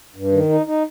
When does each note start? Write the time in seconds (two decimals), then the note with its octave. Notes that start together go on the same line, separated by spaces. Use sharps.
0.16 G2
0.32 D#3
0.49 D#4
0.66 D#4